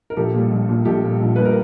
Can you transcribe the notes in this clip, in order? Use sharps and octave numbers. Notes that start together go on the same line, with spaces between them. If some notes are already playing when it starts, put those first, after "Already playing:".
A#4
A#1 G4 A4
A#2 G3
A#1
A#2 G3
A#1 G4 A4
A#2 G3
A#1
A#2 G3 B4
A#4